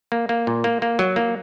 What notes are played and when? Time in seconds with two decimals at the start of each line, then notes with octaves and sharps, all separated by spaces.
0.12 A#3
0.29 A#3
0.47 A#2
0.64 A#3
0.82 A#3
0.99 F#3
1.16 A#3